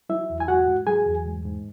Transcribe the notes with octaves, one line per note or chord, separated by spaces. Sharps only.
F#3 E4 E5
E2
G#5
G#2 F#4 F#5
G#2
F#3 G#4 G#5
E2
G#2
G#2